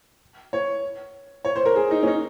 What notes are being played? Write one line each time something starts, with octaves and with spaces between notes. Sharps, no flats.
C#5
C#5
C5
A#4
G#4
D#4
C#4
D#4